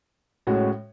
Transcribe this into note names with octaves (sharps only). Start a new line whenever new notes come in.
A2 G#3 C#4 F#4